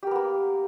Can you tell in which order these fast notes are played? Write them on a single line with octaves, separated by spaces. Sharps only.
G4 A#4 B3 A#3